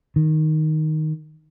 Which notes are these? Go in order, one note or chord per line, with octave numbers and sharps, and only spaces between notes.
D#3